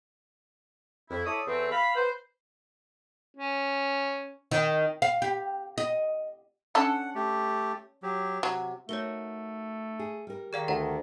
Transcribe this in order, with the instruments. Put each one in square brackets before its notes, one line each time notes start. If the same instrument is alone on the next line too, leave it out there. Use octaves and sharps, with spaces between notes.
[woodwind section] F2 E4
E4 A4 C#5 D5 E5 D#6
E2 A3 C4
F5 B5
B4 C5
[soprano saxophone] C#4
[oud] D#3
F5
G4
D#5
[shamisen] C#4 D4 A4 [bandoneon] F#5
[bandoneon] A3 G4
F#3 G4
[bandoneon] C3 [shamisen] F#3
[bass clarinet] A3 [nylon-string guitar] D#4 F#4 A#4 [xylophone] C#5 G7
[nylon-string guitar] G#4
G3 A#4
[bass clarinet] D#3 [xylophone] G#4 D5 F5
[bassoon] D2 [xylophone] G4 F#5 A#5